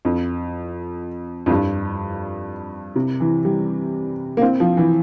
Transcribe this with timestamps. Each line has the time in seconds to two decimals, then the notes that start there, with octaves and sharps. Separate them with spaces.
0.05 F2
1.46 F2
1.50 G2
2.96 C3
3.20 E3
3.45 G3
4.37 A#3
4.41 C4
4.60 F3
4.77 E3